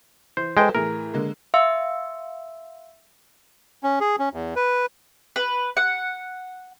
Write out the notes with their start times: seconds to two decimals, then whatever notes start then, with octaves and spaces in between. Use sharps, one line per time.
0.37 E3 C5
0.57 G#3 A4 B4 C5 G5
0.75 A2 E3 G#4 A#4
1.13 D3 G#3 A#3
1.54 E5 F5 C6 E6 C#7
3.84 C#4
4.00 G#4
4.19 C#4
4.33 E2
4.56 B4
5.36 B4
5.77 F#5